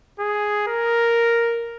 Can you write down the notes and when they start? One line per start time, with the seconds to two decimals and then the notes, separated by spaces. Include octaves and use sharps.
0.20 G#4
0.67 A#4